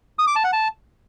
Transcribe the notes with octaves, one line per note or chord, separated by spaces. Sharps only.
D#6
D6
A5
F#5
A5